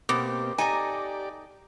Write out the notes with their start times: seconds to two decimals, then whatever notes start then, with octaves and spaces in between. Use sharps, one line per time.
0.09 B2 A#3 C4 G4 D6
0.58 D#4 G4 A4 D5 G#5 A#5